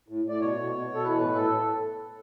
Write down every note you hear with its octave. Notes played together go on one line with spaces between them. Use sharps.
A2
A2 D5
B2 C#5
B2
B2
B2
A4
E3 B4
A2
A2 A4